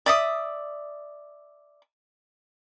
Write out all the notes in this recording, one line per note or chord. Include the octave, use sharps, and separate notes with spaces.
D5 E5 D#6